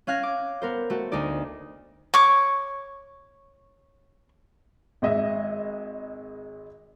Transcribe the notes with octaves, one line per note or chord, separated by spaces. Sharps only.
C#4 F5 F#6 G#6 A#6
D6
B3 A#4 C5
A3 F#4
D2 D4 D#4 D5
C#5 C#6 D6
G#1 G#3 D#5 E5